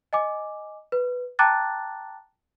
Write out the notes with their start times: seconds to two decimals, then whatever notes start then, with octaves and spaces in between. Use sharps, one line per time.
0.13 D#5 G#5 D6
0.92 B4
1.39 G5 A5 A#5 D6 F#6 A6